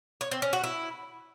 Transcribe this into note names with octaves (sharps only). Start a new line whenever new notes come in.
C#5
C4
C#4
F#4
E4